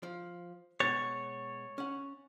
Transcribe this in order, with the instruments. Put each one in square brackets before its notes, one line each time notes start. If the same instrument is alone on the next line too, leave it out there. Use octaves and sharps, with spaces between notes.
[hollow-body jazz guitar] F3
[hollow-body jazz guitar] B2 G#3 [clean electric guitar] C#5 [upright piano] A6
[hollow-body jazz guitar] C#4 F#5